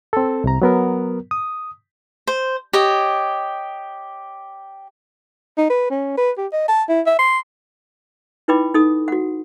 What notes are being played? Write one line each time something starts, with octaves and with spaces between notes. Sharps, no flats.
C4 A4
C2 C3 A#5
F#3 B3 A#4
D#6
C5
G4 C#5 D#5
D#4
B4
C#4
B4
G4
D#5
A5
E4
E5
C6
D#4 E4 B4 G5 B5 D6
D#4 A4 D#6
F#4 F#5